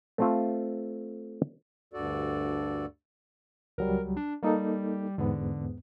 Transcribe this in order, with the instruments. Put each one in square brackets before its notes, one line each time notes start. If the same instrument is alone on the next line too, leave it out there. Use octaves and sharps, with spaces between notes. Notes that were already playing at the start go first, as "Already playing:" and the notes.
[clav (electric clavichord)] A3 C4 F4
[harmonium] D2 G2 F#4 A4 D5
[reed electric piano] C#2 F#3 G3 [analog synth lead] A#4
[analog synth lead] D4
[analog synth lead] G3 [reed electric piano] A#3 D#4 A4
[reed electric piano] E2 G#2 B3 [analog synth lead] D3